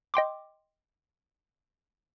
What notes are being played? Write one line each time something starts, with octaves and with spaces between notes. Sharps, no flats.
D#5 G5 C6 D6